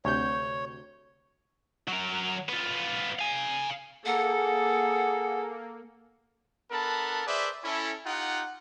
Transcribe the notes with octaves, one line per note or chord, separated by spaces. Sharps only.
D2 C3 C#5 G6
F#3 A#4
B3 F4
F5 G#5
A#3 G#4 A4 F#5
B3 D4 A4 A#4 A5 B5
G#4 B4 C5 D5 E5
C#4 E4 A4
D#4 F4 G4 F#5